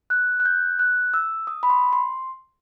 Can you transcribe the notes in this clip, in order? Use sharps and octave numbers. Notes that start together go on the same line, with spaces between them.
F#6
F#6
G6
F#6
E6
D#6
B5
C6
C6